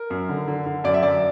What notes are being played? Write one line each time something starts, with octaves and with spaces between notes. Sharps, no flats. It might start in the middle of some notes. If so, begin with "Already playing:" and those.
Already playing: A#4
F#2
D3
D3
D3
F#2 D5
E5
F#2 D5